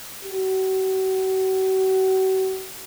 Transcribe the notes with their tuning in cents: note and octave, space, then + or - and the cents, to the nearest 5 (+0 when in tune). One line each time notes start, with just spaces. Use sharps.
F#4 +40